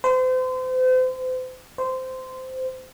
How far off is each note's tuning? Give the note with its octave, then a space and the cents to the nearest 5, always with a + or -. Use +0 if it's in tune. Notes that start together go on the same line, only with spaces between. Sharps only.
C5 -35
C5 -15